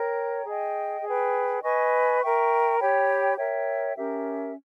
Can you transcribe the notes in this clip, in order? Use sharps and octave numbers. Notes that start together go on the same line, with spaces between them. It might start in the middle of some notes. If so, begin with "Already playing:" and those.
Already playing: A#4 C#5 G5 A#5
G#4 D#5 G5
G#4 B4 G5
B4 D#5 G#5 C#6
A#4 E5 G5 C#6
G4 C#5 G5 B5
A#4 C#5 E5 G5
C#4 G4 A#4 E5